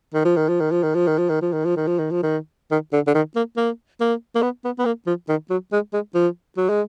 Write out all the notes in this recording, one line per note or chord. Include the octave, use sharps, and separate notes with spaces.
D#3
F3
D#3
F3
D#3
F3
D#3
F3
D#3
F3
D#3
F3
D#3
F3
D#3
F3
D#3
F3
D#3
D#3
D3
D3
D#3
A#3
A#3
A#3
A#3
B3
B3
B3
A#3
F3
D#3
F#3
G#3
G#3
F3
F#3
G#3